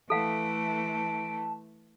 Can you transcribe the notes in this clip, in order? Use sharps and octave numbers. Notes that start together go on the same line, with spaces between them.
E3 A3 A4 F5 F#5 A5 D7